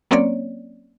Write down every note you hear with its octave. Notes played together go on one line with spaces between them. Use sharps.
F#3 A#3 C4 C#4 C#5 D5